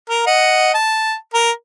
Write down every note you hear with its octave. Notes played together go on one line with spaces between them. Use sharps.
A#4
D#5 F#5
A5
A#4